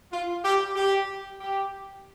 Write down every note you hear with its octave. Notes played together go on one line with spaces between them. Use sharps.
F4
G4
G4
G4